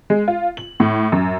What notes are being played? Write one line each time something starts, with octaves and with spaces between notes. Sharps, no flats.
G#3
F4
F#7
A2
F#2